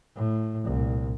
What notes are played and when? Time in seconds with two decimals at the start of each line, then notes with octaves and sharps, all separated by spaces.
0.16 A2
0.65 C2 A#2